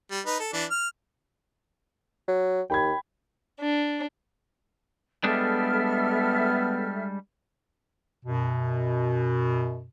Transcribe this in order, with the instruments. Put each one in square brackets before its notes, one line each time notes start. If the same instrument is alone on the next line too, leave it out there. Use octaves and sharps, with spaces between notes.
[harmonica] G3
D#4 B4
A4
E3 D4
F6
[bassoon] F#3
[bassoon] D#2 [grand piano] G5 B5 G#6
[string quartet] D4
[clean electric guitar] G3 G#3 D4 [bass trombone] B3 [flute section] A4 E5 F6
[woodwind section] F#2 B2